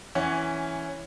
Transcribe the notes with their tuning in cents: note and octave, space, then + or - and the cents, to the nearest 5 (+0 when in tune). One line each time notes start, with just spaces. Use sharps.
E3 +0 C#4 +0 F#5 +10